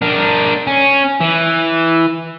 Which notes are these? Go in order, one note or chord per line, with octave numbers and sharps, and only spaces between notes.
D4 A#4
C#4
E3